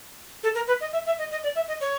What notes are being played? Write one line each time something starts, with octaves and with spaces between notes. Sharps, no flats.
A4
A#4
B4
D#5
E5
E5
D#5
D#5
D5
E5
D#5
C#5